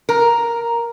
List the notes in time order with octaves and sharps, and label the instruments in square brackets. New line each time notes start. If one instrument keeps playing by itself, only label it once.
[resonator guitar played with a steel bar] A#4